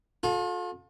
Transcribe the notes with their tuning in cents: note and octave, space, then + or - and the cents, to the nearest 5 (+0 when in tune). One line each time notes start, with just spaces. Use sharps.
F4 +40 A4 -20